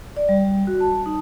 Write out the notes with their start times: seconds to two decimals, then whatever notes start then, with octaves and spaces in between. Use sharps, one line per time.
0.17 D5
0.29 G3
0.67 F#4
0.80 A5
1.06 D#4